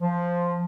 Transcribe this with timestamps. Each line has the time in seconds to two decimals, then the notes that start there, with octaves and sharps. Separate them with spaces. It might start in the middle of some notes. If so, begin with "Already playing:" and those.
0.01 F3